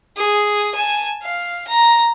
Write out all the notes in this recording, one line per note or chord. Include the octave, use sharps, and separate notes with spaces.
G#4
G#5 A5
F5
A#5